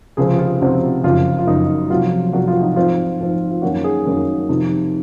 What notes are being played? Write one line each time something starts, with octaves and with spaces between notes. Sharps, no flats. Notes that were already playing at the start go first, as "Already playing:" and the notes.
C#2 C3 F3 C4 G#4
F4
C#2 C3 F3 C4 F#4
F#1 F#2 F3 F4
F4
F#1 F#2 F3 D#4
F1 F2 C3 F#3 F4
F1 F2 C3 F#3 F#4
F4
D#4
G#2 F3 C4 F4
G#2 F3 C4
F4
F#2 D#3 A#3 C#4 F#4
G#4
F#2 D#3 A#3 C#4
F2 C3 D#3